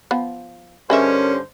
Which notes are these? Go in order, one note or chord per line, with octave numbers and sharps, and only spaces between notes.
F3 B3
G2 D3 C#4 G#4 A#4 C5 D#5 E5